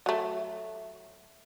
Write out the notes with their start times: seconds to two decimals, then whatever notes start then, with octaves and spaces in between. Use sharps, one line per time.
0.06 F#3 A3